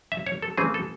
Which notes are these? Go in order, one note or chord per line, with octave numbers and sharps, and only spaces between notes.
E5
C#5
A4
C#3 E3 A3 C4 G#4
A4